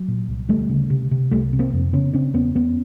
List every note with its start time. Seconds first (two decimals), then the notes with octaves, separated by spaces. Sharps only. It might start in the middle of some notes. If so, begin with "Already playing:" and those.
Already playing: F#3
0.08 A#2
0.28 C2
0.49 D2 G3 A3
0.69 C#3
0.90 C3
1.11 C3
1.31 C2 G3 A3
1.53 C3
1.59 A#3 C4
1.73 F2
1.93 C#3 B3 C#4
2.13 C#3 C4 D4
2.34 E2 B3 C#4
2.55 E2 B3 C#4